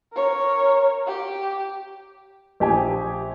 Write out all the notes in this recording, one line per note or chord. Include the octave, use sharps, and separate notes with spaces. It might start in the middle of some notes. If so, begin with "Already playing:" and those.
A#4 C#5
G4
A#1 G4 G5 G#5